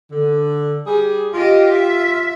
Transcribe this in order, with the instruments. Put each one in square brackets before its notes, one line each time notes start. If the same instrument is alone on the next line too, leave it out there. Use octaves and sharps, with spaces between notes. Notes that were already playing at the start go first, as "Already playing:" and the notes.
[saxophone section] D3
G3 G4 G#4
[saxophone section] F4 [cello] G4 D#5
[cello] E5